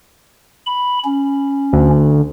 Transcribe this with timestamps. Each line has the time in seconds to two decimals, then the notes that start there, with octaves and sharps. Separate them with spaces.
0.66 B5
1.04 C#4
1.73 D2